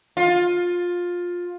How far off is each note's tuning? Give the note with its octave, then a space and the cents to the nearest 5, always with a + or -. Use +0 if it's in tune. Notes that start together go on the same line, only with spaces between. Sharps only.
F4 +15